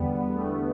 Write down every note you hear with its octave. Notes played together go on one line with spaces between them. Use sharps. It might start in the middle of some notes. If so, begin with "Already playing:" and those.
Already playing: E2 D3 G3 B3
A3